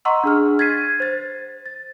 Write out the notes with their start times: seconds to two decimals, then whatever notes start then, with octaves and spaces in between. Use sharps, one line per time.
0.05 D#5 F#5 A#5 C6 C#6 E6
0.24 D4 G#4 F6
0.59 G#6 A6 B6 C7 D#7
1.00 C5 A6
1.66 A6